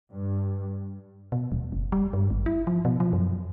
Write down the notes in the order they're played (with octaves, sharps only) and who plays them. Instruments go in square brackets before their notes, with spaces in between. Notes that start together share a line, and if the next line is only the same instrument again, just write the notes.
[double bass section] G2
[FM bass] B2
D#1
F#1
G3
G2
G#1
E4
F3
B2
F3
F#2